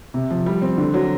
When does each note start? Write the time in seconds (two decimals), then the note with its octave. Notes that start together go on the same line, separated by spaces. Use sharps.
0.14 C3
0.31 F3
0.46 G3
0.62 C4
0.78 D3
0.94 F#3